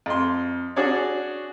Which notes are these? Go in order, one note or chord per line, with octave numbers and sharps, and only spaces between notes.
F2 C6
D4 F#4 G#4 C#5 D5